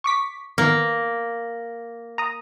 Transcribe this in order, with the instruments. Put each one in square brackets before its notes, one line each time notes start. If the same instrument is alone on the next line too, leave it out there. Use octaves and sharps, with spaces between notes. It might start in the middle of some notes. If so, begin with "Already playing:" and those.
[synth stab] C#6 D6 B6
[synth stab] D#3 B3 [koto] A#3
[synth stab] A#5 D#6